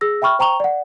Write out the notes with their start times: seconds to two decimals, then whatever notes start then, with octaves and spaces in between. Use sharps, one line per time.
0.01 G#4 E6 A#6
0.22 E5 G5 B5 C#6 F6
0.39 C5 G5 A#5 C#6 F7 G7
0.60 D5 F#5